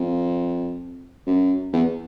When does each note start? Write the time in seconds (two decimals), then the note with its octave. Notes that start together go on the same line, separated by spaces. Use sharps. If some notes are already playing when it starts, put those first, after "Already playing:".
Already playing: F2
1.27 F#2
1.73 E2